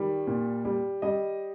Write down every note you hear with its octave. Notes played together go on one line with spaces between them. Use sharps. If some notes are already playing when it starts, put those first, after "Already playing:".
Already playing: D#3 G3
A#2
G3
G3 D#5